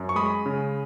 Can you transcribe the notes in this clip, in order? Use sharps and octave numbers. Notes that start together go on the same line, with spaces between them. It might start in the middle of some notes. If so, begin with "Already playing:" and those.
Already playing: F#2
C#6
G#3 B5 D#6
C#3